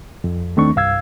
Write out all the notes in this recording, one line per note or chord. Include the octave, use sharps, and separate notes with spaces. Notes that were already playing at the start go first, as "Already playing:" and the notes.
F2
D#2 D#3 A3 C4 D4 C#6
C2 G2 F5 E6 G#6